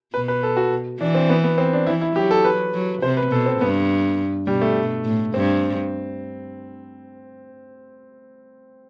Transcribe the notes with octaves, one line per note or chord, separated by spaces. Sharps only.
B2 B4
B4
A4
F#4
E3 D4
C4
B3
B3
C4
D4
E3 E4
E4
F#3 G4
A4
B4
F#3
C3 C5
B4
B2 A4
C4
G2 B3
B2 G3
A3
A2
G2 C4